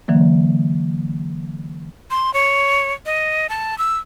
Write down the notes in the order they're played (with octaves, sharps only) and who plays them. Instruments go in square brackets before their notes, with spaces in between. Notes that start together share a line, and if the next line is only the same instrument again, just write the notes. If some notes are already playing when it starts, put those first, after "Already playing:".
[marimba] D3 E3 F#3 A#3
[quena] C6
C#5
D#5
A5
E6